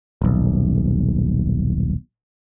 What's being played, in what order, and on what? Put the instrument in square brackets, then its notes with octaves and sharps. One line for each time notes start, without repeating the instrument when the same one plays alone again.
[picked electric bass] D#1 B1